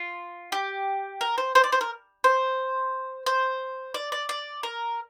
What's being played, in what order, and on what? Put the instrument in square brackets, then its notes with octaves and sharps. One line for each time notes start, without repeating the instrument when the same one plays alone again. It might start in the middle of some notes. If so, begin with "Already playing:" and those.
Already playing: [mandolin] F4
G4
A#4
C5
C5
D5
C5
A#4
C5
C5
D5
D5
D5
A#4